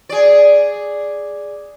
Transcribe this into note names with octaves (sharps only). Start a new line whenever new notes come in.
G#4 D5